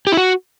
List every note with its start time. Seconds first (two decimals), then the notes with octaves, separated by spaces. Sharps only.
0.07 G4
0.12 E4
0.17 F#4